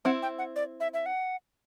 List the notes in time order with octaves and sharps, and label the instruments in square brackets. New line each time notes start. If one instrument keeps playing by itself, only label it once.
[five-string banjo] C4 E4 [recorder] F#5
[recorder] G5
F#5
D5
E5
E5
F#5